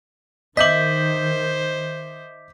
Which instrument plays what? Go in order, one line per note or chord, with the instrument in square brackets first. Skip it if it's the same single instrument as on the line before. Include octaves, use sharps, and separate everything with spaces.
[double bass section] D#3 [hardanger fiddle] C5 [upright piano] D#5 E5 F#7 [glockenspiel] D6 G6 B6